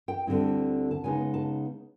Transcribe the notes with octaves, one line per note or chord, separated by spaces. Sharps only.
G5
D2 D3 G3 C4 E4
A5
C#3 F3 G#3 B3 D#4 G#5
A5